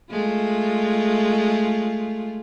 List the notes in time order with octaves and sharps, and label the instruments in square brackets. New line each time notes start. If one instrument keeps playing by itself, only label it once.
[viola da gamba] G#3 A3 F4